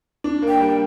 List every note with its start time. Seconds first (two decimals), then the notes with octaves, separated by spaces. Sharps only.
0.24 D4
0.42 A#3
0.48 G5
0.60 G3